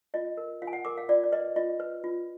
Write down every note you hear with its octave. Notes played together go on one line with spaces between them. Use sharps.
F4 D#5
A#4
F4 F5
G#5
F#5
A#4 D6
F5
F4 D5
D5
B4 D#5
F4 D#5
B4
F4